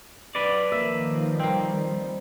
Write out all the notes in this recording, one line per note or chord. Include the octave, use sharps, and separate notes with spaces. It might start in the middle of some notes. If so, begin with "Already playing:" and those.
B4 D5
D#3 F3 A#3 E5
G3 A#3 C4